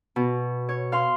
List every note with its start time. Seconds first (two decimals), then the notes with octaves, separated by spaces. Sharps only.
0.16 B2
0.69 C#5
0.92 F5 C6